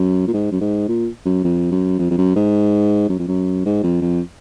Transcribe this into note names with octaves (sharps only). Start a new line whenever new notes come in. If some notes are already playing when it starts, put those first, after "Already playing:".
Already playing: F#2
A#2
G#2
F#2
G#2
A#2
F#2
F2
F#2
F2
F2
F#2
G#2
F#2
F2
F#2
G#2
F2
F2